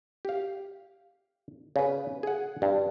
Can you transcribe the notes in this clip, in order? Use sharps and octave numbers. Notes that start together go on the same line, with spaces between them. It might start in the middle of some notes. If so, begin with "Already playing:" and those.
G4 F5
C#3 B4
G#4 F#5
G2